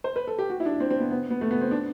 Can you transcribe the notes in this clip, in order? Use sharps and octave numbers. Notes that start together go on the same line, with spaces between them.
C5
B4
A4
G4
F#4
E4
D4
C4
C4
B3
B3
B3
A3
B3
C4
D4